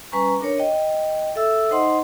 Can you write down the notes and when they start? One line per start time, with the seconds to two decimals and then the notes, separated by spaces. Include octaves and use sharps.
0.12 G3 C#4 B4 G#5 A#5 C#6
0.41 D4 A#4 C#5
0.58 D#5 G5
1.36 A4 E5 E6
1.71 D#4 C5 D#5 F#5 C6